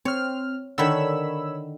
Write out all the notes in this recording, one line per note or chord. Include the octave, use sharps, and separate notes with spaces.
C4 C#5 F6
D3 D#3 C#5 B5 E6